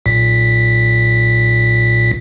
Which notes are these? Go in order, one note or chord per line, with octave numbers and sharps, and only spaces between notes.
B1 A#2 B6